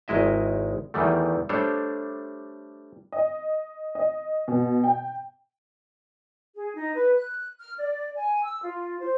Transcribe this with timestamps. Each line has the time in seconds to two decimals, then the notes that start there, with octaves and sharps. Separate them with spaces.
0.08 G#1 D#3 G#3 E4 D#5 E5
0.94 E2 D#3 E3 G3 A3
1.49 G3 A3 D4 A4 C5 C#5
3.12 D#5
3.95 D#5
4.48 B2
4.84 G5
6.55 G#4
6.75 D#4
6.94 B4
7.16 F#6
7.60 F6
7.78 D5
8.16 G#5
8.43 E6
8.62 F4
9.00 C5